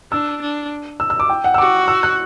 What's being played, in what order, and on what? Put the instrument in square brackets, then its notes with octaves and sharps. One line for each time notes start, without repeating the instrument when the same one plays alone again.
[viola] D4 [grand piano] E6
[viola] D4
[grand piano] E6
E6
D6
G5
F#5
E6
[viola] F#4 [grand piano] D6
[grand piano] E6
F#6